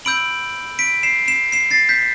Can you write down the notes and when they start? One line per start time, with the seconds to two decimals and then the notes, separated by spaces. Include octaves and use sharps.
0.05 B5 E6 G6 D7 F#7
0.79 B6 D7
1.03 C7 E7
1.28 C7 E7
1.52 C7 E7
1.71 A6 C7
1.89 G6 B6